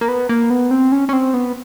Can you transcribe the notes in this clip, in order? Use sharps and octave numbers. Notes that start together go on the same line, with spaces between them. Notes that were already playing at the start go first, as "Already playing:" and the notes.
A#3
B3
A#3
B3
C4
C#4
C#4
C4
B3